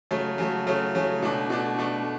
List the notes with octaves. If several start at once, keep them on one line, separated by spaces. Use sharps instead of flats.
C#3 F#3 A3
C#3 F#3 A3
C#3 F#3 A3
C#3 F#3 A3
B2 A3 D4
B2 A3 D4
B2 A3 D4